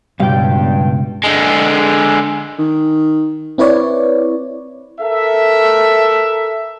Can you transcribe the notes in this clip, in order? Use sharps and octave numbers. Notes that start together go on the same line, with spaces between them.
C#2 G2 B2 G3 F5 G5
D3 G#3
D#3
C4 E4 B4 C#5 D5
A4 A#4 E5